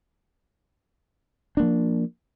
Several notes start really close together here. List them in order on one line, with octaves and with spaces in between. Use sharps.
D4 A#3 F3